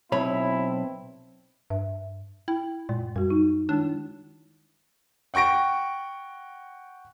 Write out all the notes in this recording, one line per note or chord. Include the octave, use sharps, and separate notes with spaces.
B1 C4 E4 C#5 B5
G2 E5
E4 G5
F#2 A#2 G#3
F#2 G3 F#4
D#4
D#3 G#3 D4 E4
F#5 G5 C#6 A#6 D7